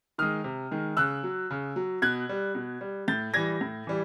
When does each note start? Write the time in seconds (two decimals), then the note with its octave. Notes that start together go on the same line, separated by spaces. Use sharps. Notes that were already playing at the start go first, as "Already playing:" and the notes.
0.18 D#3 G#3 D#6 F6
0.44 C3
0.71 D#3 G#3
0.97 C#3 E6 F#6
1.23 F#3
1.50 C#3
1.76 F#3
2.02 B2 F#6 G#6
2.29 G3
2.55 B2
2.81 G3
3.08 A2 G6 A6
3.34 E3 G3 G#6 A#6
3.61 A2
3.87 E3 G3